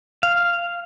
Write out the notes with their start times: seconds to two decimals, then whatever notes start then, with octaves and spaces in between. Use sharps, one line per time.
0.23 F5